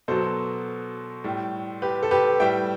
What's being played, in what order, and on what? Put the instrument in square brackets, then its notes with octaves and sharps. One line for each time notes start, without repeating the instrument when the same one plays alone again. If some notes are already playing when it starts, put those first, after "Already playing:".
[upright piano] B2 F#3 A4 C5
A2 G3
G4 B4
A4
G4 B4
A2 G3 E5 G5